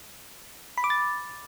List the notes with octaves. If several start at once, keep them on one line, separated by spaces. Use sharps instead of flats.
B5
D6
A6